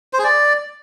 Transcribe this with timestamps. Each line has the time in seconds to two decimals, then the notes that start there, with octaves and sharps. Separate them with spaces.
0.13 C5
0.19 G#4
0.24 D5